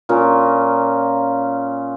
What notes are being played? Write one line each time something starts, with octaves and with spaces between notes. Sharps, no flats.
A#2 C#4 F4 A#4